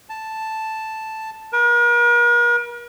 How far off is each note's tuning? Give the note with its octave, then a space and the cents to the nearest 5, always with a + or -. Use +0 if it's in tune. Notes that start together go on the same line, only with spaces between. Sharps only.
A5 +0
A#4 +45